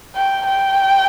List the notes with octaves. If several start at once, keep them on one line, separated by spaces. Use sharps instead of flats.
G5
G5